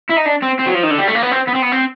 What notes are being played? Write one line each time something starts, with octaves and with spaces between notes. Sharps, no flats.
E4
D#4
D4
C4
C4
F#3
F3
D#3
D3
G3
A3
A#3
B3
C4
B3
C4
B3
C4